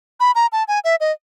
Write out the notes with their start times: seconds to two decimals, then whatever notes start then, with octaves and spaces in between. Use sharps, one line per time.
0.20 B5
0.35 A#5
0.52 A5
0.68 G#5
0.84 E5
1.00 D#5